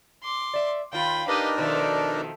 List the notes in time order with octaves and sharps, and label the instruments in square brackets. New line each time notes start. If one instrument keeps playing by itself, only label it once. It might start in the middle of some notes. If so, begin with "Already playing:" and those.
[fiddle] C6 D6
[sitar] D5 E5
[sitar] D#2 F4 [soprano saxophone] F5 [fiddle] G5 B5
[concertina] D4 D#4 A#4 [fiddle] G4 D#5 [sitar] B4
[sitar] B2 D#3 F3 [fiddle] A4 E5 [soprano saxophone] D5